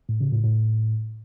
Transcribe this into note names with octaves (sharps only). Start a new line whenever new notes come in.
A2
C#3
A2
A2